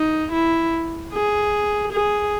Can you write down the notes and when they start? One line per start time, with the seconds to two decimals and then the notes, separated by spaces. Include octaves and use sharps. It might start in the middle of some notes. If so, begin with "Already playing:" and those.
Already playing: D#4
0.32 E4
1.13 G#4
1.93 G#4